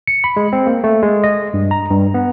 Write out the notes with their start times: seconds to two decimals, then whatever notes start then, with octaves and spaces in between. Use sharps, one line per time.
0.07 C#7
0.24 B5
0.36 G#3
0.53 C4
0.67 A#3
0.84 A3
1.03 G#3
1.24 D#5
1.54 G2
1.71 A#5
1.90 G2
2.14 B3